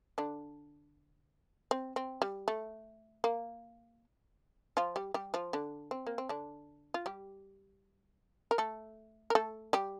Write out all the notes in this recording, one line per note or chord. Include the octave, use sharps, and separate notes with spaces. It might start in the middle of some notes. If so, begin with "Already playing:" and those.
D3 D4
C4
C4
G3
A3
A#3
F3 F4
G3 G4
G3 G4
F3 F4
D3 D4
C4
A#3
C4
D3 D4
F4
G3 G4
A#4
A3 A4
A#4
A3 A4
G3 G4